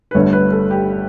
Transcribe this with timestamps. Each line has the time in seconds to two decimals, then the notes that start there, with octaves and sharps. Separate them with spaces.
0.11 B4
0.14 G1 G2 D3 A3 C#5
0.33 B4
0.52 A4
0.71 G4